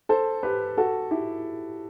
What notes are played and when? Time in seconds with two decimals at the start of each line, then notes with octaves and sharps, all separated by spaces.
0.09 A4 C5
0.43 G4 B4
0.77 F#4 A4
1.11 E4 G4